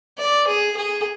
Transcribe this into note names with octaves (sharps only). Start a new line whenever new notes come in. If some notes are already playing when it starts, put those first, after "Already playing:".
D5
G#4
G#4